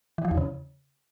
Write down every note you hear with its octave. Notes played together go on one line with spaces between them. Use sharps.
E3
F3
E2
C#3